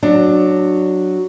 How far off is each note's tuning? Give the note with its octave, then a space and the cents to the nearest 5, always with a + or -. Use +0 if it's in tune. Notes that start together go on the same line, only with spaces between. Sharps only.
F#3 +0 D4 +15